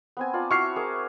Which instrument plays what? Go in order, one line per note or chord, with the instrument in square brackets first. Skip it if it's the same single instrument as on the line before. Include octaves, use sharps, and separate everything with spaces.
[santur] B3 C4 G#5
F4 D5 A5
[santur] E4 F#4 E5 [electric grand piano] C#6 F6 C7
[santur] G#4 A#4 D6